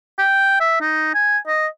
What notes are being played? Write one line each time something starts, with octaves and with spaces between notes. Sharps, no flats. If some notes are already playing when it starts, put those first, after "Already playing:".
G5
E5
D#4
G#5
D#5